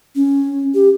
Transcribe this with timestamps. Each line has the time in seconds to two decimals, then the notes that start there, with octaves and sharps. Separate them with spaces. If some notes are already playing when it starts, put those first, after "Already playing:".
0.15 C#4
0.74 G4